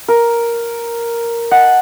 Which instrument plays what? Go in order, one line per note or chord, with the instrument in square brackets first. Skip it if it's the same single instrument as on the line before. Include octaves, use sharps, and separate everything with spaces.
[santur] A#4
[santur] D#5 A5 [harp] F#5